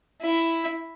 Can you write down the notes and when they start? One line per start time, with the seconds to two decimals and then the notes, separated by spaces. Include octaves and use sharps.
0.22 E4